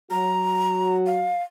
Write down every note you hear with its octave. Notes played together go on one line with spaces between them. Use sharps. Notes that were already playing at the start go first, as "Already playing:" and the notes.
F#3 F#4 A#5
F5